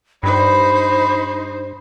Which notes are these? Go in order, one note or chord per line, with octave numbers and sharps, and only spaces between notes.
G2 D#4 C5 B5